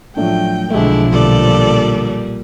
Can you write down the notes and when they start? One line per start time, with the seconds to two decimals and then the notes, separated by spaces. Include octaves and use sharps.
0.17 A2 F3 F#3 A3 D4 G5
0.70 B1 D3 F3 G#3 A3 D4 E4
1.12 A#2 D3 G3 A4 D5